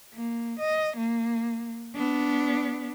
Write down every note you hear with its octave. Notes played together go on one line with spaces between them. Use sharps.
A#3
D#5
A#3
B3 D4